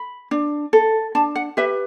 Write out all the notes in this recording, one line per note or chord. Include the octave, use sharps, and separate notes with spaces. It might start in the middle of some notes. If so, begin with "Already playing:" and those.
Already playing: B5
D4
A4
D4 A5
F#5
G4 B4 E5